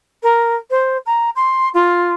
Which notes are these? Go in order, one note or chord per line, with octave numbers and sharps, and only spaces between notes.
A#4
C5
A#5
C6
F4